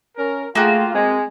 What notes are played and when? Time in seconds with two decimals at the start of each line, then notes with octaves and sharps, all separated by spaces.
0.16 C#4 A#4
0.55 A3 A#3 F4 F#4 G#4 G5
0.94 G#3 C4